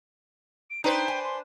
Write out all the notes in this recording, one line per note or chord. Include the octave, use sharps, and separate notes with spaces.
D7
D4 D#4 B4 C5 G5
G#5
C6